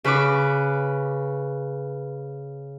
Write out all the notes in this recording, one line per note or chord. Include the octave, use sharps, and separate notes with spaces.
C#3 B4 C#6 D6